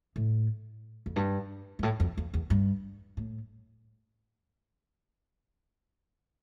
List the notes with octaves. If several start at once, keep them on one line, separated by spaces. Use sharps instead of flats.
A2
F2
G2
G2
A2
F2
F2
E2
G2
A2